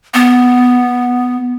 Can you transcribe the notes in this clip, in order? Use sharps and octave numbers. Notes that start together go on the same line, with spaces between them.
B3